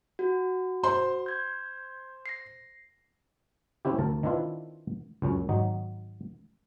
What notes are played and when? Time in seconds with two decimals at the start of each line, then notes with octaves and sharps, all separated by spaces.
0.19 F#4
0.83 C5 C6
1.26 G6 G#6
2.26 A#6 C7
3.85 C4 C#4 E4 G4
3.99 D2 A#4 A5
4.23 D#3 C4 D4 E4 F4 B4
5.22 C#2 F#2 C#4
5.49 G#1 F#3 D#4